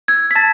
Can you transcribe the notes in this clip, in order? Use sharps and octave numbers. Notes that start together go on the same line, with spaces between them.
E6 G#6
B6
A5 A6